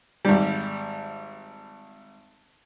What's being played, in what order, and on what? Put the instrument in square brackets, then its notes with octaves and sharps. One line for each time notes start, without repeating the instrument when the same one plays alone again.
[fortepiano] G#1 G3